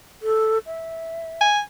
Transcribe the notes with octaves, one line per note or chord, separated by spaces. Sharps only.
A4
E5
G#5